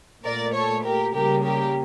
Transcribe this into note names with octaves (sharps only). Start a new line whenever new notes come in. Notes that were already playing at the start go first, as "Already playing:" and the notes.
A#2 A3 A#4 D5
A4 C#5
G4 A#4
C#3 G3 A#3 G4 A#4
G4 A#4